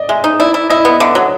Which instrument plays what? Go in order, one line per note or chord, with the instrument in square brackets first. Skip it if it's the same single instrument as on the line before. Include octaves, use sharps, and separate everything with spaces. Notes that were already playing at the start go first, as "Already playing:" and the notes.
Already playing: [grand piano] D5 D#5
[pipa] G#3 [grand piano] E5
[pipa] D#4
[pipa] E4 [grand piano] D5
[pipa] E4
[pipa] E4 [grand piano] D#5
[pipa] B3
[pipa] D3 [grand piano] E5
[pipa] F#3